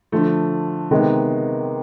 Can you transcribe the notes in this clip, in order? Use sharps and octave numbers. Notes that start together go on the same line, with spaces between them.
D3 F3 A3
C3 D#3 G#3 B3 D#4